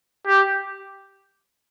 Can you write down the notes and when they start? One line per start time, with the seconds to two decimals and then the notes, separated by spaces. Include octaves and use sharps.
0.27 G4